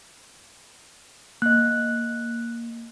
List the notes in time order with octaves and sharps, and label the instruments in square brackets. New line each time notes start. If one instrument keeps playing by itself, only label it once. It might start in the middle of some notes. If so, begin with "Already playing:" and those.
[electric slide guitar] A#3 D#5 [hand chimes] F#6